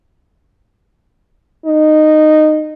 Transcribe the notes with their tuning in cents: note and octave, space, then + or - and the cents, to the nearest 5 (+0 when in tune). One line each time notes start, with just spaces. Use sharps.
D#4 -15